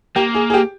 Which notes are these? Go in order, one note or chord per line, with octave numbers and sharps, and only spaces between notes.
A#3 G4
G#4
G#4
G4